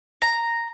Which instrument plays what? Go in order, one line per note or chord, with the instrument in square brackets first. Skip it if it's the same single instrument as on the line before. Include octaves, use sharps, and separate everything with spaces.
[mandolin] A#5